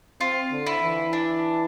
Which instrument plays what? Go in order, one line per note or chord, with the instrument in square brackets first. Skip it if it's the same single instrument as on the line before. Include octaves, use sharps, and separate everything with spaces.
[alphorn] C4 [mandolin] F4
[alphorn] D3
[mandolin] E4
[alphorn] E3
[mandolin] D4